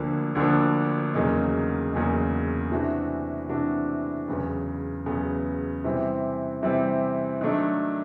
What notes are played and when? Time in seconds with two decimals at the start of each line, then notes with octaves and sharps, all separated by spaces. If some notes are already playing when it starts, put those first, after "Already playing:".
Already playing: D2 D3 F3 A#3 D4
0.35 D2 D3 F3 A#3 D4
1.14 E2 C#3 F#3 A#3 D#4
1.92 E2 C#3 F#3 A#3 D#4
2.71 C3 E3 A3 D4 F#4
3.49 C3 E3 A3 D4 F#4
4.28 E2 C#3 F#3 B3
5.06 E2 C#3 F#3 B3
5.84 C3 E3 G3 C4
6.63 C3 E3 G3 C4
7.41 D#3 F#3 A3 D4